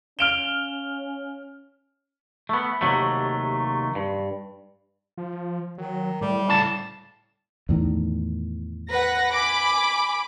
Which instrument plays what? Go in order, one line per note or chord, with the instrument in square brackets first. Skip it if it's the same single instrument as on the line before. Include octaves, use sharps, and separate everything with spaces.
[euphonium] C#4 [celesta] F5 F7 G7 [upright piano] F6 D7 E7
[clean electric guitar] A3 B3
D#2 C3 F#3 A3
G2
[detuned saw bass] F3
[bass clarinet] D#3 [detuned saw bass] F#3
[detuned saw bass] A2 [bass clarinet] G3
[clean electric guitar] D2 C#3 A5
[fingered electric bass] E2 A2 D#3
[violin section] B4 F#5 A#6
G#5 B5 D6